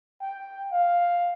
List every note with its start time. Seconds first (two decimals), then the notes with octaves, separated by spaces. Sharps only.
0.21 G5
0.72 F5